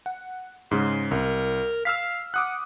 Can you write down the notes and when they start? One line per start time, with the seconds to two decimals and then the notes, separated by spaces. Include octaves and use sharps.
0.06 F#5
0.71 G#2 C#3 G#3 C6
1.11 C2 A#4
1.85 F5 E6 F6 B6
2.34 F#5 D6 D#6 F#6